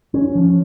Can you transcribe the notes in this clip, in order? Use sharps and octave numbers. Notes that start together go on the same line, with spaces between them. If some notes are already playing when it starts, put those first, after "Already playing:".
C#4
F3